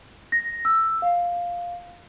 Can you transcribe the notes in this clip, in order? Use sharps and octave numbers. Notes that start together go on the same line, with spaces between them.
A#6
E6
F5